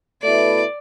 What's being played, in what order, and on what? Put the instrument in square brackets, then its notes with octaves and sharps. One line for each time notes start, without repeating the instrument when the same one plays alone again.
[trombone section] B2 A3 E4 B4 [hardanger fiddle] D5